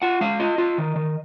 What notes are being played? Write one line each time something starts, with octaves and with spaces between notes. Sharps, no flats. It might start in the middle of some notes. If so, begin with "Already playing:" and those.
F4 F#5
G#3 F5
F4 D#5
F4
D#3
D#3